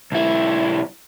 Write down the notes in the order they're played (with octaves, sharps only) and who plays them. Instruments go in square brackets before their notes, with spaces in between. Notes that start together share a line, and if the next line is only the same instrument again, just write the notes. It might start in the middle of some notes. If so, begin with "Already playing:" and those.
[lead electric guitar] B1 E4